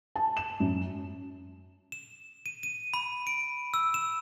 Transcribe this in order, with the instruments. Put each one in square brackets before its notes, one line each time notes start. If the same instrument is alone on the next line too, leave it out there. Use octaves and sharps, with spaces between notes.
[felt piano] A5
E7
F#2
[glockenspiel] E7
D#7
D#7
B5
D7
E6
E7